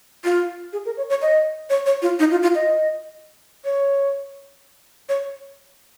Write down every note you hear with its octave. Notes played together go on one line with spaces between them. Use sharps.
F4
G#4
A#4
C#5
C#5
D#5
C#5
C#5
F4
D#4
F4
F4
D#5
C#5
C#5